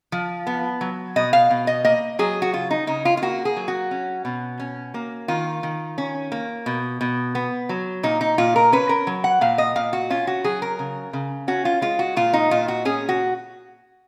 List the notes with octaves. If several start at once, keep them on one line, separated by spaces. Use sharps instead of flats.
F3
B3
F#3
B2 D#5
F5
B2
D#5
A#3 D#5
F#3 G#4
F#4
C#3 F4
D#4
C#3 D#4
F4
F4
A#3 F#4
G#4
F#3
F#4
C#4
B2
C#4
A#3
D#3 F4
D#3
C#4
A#3
B2
B2
B3
F#3
A#2 D#4
D#4
A#2 F4
A#4
C#4 B4
A#4
F#3
F#5
A#2 F5
D#5
A#2 F5
F#4
C#4 F4
F#4
F#3 G#4
A#4
C#3
C#3
C#4 F#4
F4
G#3 F4
F#4
A#2 F4
D#4
A#2 F4
F#4
C#4 G#4
F#4